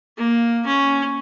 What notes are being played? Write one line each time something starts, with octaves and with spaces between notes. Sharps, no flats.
A#3
C#4